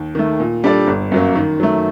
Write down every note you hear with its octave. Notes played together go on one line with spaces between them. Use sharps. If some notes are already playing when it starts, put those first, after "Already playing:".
Already playing: D#2
D#3 A3
A#2
G3 D4 A4 D5
G1
F#2 F#3 A#3
D#3
F#3 A3